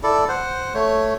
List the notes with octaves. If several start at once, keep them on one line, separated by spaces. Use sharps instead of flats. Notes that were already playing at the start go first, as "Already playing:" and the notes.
E4 A4 D5
C5 F#5
A3 C#5